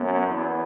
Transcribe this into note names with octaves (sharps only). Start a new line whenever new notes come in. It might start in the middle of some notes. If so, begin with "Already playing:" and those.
Already playing: F#2 B3
E2